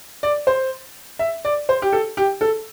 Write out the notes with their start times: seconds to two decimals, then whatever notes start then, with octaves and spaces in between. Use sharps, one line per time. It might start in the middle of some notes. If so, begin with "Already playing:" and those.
0.23 D5
0.47 C5
1.19 E5
1.45 D5
1.69 C5
1.82 G4
1.93 A4
2.17 G4
2.41 A4